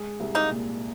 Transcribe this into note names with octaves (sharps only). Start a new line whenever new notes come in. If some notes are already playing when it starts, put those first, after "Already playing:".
Already playing: G#3 G#4
C2
A#3 D#4
A#2